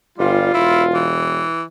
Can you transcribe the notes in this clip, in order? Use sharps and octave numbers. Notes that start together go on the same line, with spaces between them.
G1 G3 F4
E1 E4
E3